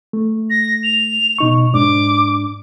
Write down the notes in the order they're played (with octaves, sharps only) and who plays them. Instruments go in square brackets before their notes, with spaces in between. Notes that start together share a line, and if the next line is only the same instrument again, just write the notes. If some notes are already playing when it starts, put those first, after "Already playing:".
[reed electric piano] A3
[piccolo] A#6
F7
[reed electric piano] B2 D#4 C#6
[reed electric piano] G#2 D4 [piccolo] D6